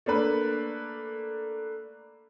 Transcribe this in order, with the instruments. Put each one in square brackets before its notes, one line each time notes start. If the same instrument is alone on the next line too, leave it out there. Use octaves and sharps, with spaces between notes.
[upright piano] A3 A#3 D4 B4